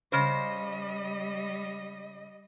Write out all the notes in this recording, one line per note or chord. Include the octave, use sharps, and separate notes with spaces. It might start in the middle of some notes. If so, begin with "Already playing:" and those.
C#3 G3 C5 D#5